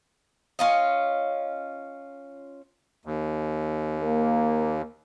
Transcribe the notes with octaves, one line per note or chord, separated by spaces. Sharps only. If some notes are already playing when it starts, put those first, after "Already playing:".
C#4 F4 D#5
D#2
A#3